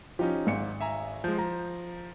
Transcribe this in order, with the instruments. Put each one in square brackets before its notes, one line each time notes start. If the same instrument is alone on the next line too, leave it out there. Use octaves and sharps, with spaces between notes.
[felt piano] F3 [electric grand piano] C#4 D#4 G4
[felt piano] G#1 C#7 [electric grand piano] G#2
[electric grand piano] E5 G#5 A#5
[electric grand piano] F3 G#3 [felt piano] G6
[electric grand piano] F3 [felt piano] A#5